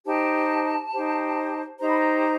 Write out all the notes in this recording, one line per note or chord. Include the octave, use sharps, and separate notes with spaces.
D#4 G4 C5 A5
D#4 G4 C5
D#4 G4 C5 A#5
B5
A#5